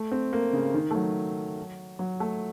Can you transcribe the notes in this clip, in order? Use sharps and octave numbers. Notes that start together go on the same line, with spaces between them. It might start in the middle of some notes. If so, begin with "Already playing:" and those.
Already playing: A3
C4
A#3
C#3
D#3
A3
F#3
F#3
A3